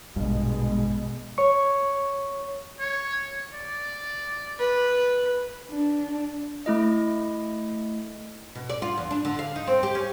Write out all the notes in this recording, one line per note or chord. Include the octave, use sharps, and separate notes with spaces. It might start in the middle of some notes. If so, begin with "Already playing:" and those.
A#1 G2 B2 G#3
C#5 C#6
C#5
D5
B4
D4
A3 E4 D#5
B2
D5
F4
E2
D4
D3
F5
D#4
C4
G4
C#4